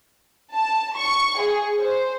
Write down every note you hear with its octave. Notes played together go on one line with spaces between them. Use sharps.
A5
C#6
G#4
C5